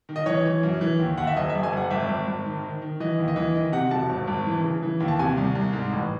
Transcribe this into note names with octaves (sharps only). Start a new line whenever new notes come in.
D#3
D#5
E3 C#5
E3
F#2
E3
D#2
D#2 F#5
E5
F#1 D#5
E5
F#1
G#5
F#1 F#5
G#1 E5
G#1
G#1
D#3
D#3
D#3
E3 D#5
D#2
D#5
E3
D#3 D#5
C3 F#5
E1 A5
G#1
G#1
E3
C#3
E3
D#2
A5
C3 G#5
C2
C2
G#2
A1